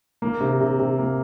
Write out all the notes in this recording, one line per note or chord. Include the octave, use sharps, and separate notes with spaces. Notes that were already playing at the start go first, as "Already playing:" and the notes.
A#3
C3
C3
C3
A#3